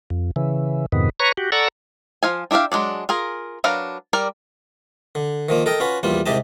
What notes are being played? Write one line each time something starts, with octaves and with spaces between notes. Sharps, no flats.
F2
C#3 E3
F2 G#2 C3 D#3 B3
B4 C#5 A#5 C#6
F#4 G4
A4 D5 F#5 A#5 C#6 E6
F3 F5 G#5
D4 E4 G4 E5 F5
F#3 G#3 D4 D5
F4 G#4 A#4
F#3 D4 A#4 B4 F5
G3 A#4 D5
D3
D#3 F3 A#3
A4 A#4 D#5 G5
C#4 F4 F#4 B4
A#1 E2 G3 F4
C2 G#2 C3 G4 D#5 A5